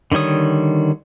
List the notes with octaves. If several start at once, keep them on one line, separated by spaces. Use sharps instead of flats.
D3 D#3 G3 C#5 D#6